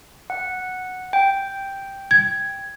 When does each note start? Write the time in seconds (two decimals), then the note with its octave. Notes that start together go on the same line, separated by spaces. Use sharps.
0.30 F#5
1.13 G5
2.11 G#6